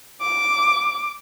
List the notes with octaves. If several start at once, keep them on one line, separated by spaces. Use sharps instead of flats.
D6